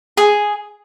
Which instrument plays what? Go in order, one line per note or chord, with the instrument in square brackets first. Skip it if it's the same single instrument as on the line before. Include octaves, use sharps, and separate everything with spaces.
[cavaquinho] G#4